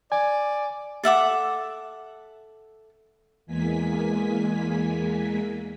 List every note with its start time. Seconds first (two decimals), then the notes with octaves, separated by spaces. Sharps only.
0.12 D5 G#5
1.03 A4 E5 F#5 D6
3.46 E2 E3 G#3 A#3 G#5 B6